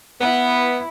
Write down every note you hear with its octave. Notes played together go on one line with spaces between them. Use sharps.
B3 E4